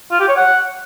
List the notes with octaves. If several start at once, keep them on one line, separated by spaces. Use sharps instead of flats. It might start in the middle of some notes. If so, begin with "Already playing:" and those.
F4
G4
C#5
F#5